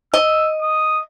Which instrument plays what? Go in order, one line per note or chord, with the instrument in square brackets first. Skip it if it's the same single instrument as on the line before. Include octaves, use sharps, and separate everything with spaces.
[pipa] D#5 [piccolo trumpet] E6
[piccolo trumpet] D#6